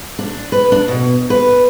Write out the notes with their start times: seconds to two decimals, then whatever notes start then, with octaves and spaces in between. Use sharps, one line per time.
0.19 D4
0.52 B4
0.72 D4
0.88 B2
1.30 B4